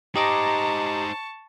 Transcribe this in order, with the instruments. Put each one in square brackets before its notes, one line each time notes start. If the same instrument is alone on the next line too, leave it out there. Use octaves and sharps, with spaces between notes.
[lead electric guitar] D#4 C5 [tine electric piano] G4 D#5 D6 [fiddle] A5 C#6 [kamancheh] A#5